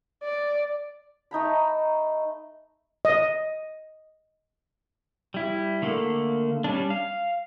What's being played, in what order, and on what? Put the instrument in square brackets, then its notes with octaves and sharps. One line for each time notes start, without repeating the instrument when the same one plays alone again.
[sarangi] D5
[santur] A3 D#4 A#5 B5
[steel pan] D#5
[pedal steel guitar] G3 E4
D3 A3 A#3
G3 C#4 D4
F5